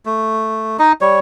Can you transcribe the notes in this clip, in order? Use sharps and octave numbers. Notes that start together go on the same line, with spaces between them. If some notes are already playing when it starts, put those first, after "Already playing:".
A3
D#4 D#5
G3 C#5